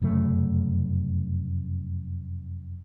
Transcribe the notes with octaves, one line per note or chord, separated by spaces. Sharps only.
F1 F#2 C#3 A3